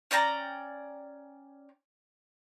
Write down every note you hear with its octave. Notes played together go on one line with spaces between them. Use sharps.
C#4 D5 G5 A#5